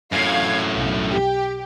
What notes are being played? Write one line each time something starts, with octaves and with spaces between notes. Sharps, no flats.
F#2 A2 F5 G#6
B1
G4